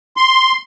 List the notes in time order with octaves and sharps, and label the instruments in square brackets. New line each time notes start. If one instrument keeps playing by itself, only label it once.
[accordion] C6